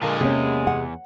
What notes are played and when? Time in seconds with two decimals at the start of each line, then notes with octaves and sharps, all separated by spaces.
0.02 A#2 D3 G#3 A#4 F5 A5
0.21 E2 C3 A#3 C#4 G4 G#4
0.67 F#5